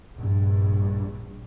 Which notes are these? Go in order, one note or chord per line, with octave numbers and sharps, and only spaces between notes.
A#1 G2